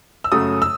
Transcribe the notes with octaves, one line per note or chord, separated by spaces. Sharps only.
E6
F#2 C#3 F#3 A3 D#6
E6